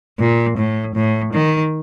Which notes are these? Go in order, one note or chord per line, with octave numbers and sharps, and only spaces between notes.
A#2
A2
A2
D#3